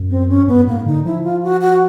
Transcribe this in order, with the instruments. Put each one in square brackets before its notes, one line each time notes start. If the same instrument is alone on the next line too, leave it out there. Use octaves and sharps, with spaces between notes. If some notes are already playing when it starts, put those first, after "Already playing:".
Already playing: [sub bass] F#2
[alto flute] C4
C#4
[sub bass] G2 [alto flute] B3
[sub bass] G#2 [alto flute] A#3
[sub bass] D3 [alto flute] D#4
[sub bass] F3 [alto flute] E4
[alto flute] F4
F#4
F#4